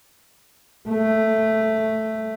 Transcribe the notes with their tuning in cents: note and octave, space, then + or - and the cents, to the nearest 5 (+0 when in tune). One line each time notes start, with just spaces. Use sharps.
A3 +0